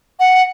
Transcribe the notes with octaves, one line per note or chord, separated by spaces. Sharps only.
F#5